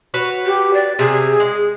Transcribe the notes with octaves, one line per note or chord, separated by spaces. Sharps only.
F#4 B4 C#5
G4
D5
C3 G#4
G#3